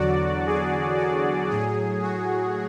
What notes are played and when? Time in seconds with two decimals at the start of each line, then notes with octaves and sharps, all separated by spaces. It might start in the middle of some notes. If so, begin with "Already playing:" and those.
Already playing: E2 D3 F#3 F#4 D5
0.46 G#4
0.98 F#4
1.50 A2 F#3 G#4
2.02 F#4